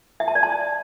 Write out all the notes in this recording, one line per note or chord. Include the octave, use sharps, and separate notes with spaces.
E5
A5
D5
A5